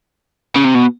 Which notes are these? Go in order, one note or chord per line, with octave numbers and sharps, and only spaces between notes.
C#3
C3
B2